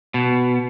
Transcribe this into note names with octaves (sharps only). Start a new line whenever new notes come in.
B2